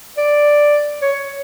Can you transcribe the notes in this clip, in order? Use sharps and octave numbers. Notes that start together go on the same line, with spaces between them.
D5
C#5